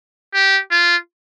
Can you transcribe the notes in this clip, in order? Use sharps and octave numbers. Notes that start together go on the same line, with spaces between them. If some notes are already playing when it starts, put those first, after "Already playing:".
G4
F4